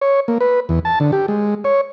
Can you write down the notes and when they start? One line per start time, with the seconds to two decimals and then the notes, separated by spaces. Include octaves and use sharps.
0.01 C#5
0.28 A#3
0.40 B4
0.69 E2
0.85 A5
1.00 D3
1.12 G4
1.28 G#3
1.64 C#5